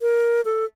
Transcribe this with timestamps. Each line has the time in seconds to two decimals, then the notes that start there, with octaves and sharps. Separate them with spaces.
0.02 A#4
0.45 A4